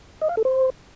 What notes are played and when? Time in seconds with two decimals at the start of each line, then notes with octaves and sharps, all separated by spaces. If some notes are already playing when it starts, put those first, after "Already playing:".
0.21 D#5
0.29 F5
0.37 A4
0.45 C5